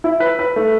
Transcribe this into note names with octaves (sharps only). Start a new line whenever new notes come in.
E4
B4
B4
A3